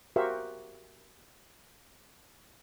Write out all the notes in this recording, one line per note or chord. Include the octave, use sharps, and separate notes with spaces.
F#4 G4 A#4 C5 E5 F5